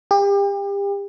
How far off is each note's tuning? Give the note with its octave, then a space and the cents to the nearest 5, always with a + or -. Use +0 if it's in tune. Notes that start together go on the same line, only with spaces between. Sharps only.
G4 +35